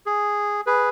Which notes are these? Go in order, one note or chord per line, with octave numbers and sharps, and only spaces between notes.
G#4
G#4 B4